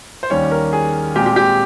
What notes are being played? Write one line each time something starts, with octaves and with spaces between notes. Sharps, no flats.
C5
D#2 D#3 G3 C#4 C#5
A#4
G#4
A#2 G#3 C4 G4
G4
G4